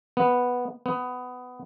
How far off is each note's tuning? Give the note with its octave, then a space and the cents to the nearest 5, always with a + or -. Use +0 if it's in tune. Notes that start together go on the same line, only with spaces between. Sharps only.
B3 -5
B3 +15